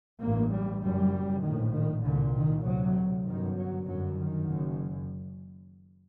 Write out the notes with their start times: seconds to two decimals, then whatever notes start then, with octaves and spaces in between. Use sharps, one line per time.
0.21 A1 G2 A#3
0.51 G3
0.82 F#1 F#2 G3
1.43 A#1 A2 D#3
1.74 D#3
2.04 C2 A#2 D3
2.35 D#3
2.65 D2 C3 F#3
3.26 G1 F#2 D#3
3.56 F#3
3.87 G1 F#2 F#3
4.17 D#3
4.47 F#1 F#2